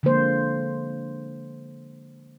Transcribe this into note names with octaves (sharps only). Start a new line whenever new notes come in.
D3 F3 G#3 A#3 C5